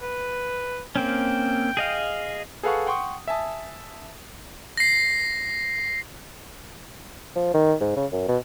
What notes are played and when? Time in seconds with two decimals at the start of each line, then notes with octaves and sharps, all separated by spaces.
0.02 B4
0.96 A#3 C4 C#4 G5
1.77 G#4 D#5 F5
2.63 G#4 A4 B4 F5 F#5 C#6
2.86 F#5 G5 C6 C#6 D#6
3.28 E5 G#5 A5 D#6
4.77 A#6 C7
7.36 F3
7.54 D#3
7.81 G#2
7.97 C#3
8.12 F#2
8.28 B2